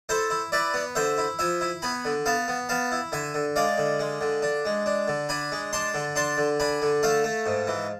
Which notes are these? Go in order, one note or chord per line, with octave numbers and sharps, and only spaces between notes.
E4 A4 C5
E4
E4 B4 D5
B3
D3 C5 E5
E4
F3 E5 G#5
E4
B3 G#5 B5
D3
B3 F5 A5
B3
B3 F5 A5
E4
D3 E5 G#5
D3
G#3 D5 F5
D3
G#3
D3
D4
G#3
D4
D3
D4 G#5 B5
G#3
D4 A5 C6
D3
D4 A5 C6
D3
D4 G#5 B5
D3
A3 F5 A5
A3
G#2
E3